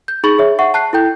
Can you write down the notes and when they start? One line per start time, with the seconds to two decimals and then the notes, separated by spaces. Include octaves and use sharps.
0.08 G6
0.24 D#4 G#4 B5 C#6 A6 F#7
0.38 G#4 C#5 E5
0.59 E5 F#5 C#6
0.74 A5 F#6 C7
0.93 E4 A4 G5 G6